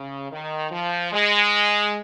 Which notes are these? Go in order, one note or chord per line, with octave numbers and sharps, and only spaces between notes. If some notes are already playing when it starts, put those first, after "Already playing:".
Already playing: C#3
D#3
F3
G#3